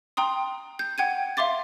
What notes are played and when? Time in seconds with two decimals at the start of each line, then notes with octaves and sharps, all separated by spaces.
0.17 G5 A#5 C6 D#6
0.79 G6
0.98 F#5 G5 G#6 D#7
1.37 E5 F5 C6 D6 A6